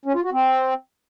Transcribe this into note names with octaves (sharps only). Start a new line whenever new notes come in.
C#4
F4
F#4
C4